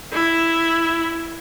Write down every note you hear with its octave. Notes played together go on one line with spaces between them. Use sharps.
E4